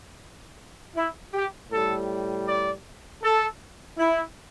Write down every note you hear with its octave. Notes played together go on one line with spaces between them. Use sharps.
E4
G4
A2 G3 A4
D5
A4
E4